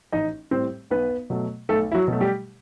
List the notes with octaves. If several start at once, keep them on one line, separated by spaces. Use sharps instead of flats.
A1 D#4 D#5
A2 G3 C4 C5
B1 B3 B4
B2 F#3 A3
B1 A3 A4
E4
F#3 F#4
B2 F#3 A3
G3 G4